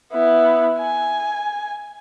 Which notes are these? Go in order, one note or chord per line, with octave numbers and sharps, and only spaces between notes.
B3 E4
G#5